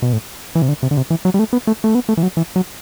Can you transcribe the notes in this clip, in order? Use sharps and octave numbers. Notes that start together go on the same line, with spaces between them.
B2
A2
E3
C3
D3
C3
D3
C3
E3
F#3
G3
A3
B3
A3
A3
B3
A3
E3
F#3
E3
F#3